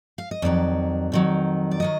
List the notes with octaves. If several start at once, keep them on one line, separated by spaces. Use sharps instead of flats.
F5
D#5
F2 D#3 F#3 D5
F2 D#3 F#3
D5
D#3 F#3 D#5